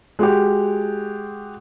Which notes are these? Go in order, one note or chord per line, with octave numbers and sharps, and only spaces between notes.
G#3 F#4 G4